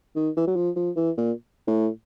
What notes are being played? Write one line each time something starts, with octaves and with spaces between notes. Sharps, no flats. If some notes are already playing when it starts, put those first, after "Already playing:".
D#3
E3
F#3
F3
F3
E3
A#2
A2